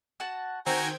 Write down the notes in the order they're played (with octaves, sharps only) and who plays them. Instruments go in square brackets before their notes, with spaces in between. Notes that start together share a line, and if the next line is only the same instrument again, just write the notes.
[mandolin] F#4 F#5 A5
[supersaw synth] D#3 G5 G#6 [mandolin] C4 [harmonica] F#4 G#5 A#5 [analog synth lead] C5